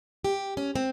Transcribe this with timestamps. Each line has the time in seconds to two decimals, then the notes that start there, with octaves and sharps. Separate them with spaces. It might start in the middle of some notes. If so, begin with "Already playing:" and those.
0.24 G4
0.57 C#4
0.76 C4